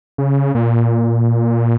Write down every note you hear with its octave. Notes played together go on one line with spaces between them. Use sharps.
C#3
A#2